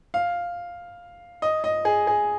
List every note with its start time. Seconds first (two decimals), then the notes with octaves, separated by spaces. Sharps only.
0.14 F5
1.42 D#5
1.64 D#5
1.85 G#4
2.07 G#4